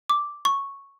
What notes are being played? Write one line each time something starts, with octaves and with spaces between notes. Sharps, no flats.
D6
C#6